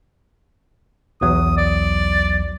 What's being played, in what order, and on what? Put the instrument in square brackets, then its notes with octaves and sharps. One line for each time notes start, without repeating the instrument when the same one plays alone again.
[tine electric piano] B1 E2 F#3 [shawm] D#6
[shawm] D5